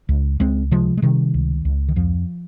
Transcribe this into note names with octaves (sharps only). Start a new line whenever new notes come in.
C#2
C#2 G#3 C4
C3 F3 G#3
G#3
C3 D#3 G3
C#2
C#2
D#3
F2 F3